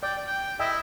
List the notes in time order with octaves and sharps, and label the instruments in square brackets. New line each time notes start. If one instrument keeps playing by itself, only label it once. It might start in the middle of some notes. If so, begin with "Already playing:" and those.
[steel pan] D5 [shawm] G5
[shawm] G5
[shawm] E4 [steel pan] D#5 E5 G5